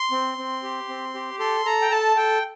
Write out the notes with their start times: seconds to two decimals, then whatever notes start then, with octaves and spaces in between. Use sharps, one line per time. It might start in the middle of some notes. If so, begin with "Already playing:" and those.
Already playing: C6
0.11 C4
0.38 C4
0.63 G4
0.88 C4
1.14 G4
1.40 A4 C6
1.65 A4 A#5
1.82 G5
1.91 A4 A5
2.16 A4 G5